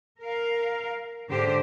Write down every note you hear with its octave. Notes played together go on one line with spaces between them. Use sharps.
A#4 F5
G#2 D3 G4 C5